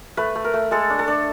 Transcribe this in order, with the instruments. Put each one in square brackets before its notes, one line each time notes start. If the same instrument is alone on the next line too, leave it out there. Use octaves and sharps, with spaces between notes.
[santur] A3 B4
A3
A#4
A3
G#3 A4
D4
A4
D4